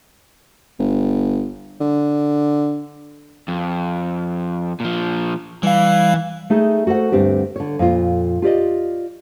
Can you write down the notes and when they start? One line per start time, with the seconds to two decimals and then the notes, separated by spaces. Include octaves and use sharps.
0.80 G1
1.80 D3
3.48 F2
4.80 A#2 F3
5.63 E3 G3 F5
6.50 A3 D#4 G#4
6.87 F#4 A4 C5 F#5
7.12 D2 G2 C4 D4 G4
7.56 D3 C#5
7.79 F2 A#2 F4
8.42 F4 G4 D5 D#5